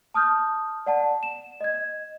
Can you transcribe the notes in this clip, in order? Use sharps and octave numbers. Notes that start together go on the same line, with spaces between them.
A5 D#6 F6 G6
D5 F#5 A5
E7
D#5 G#6